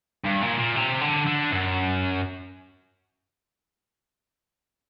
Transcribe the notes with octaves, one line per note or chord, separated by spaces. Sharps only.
G2
A#2
A#2
C3
D3
D3
F#2